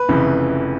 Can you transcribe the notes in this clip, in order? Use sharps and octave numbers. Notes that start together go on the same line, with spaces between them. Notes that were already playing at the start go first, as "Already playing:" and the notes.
Already playing: B4
F1 F2 C#3 E3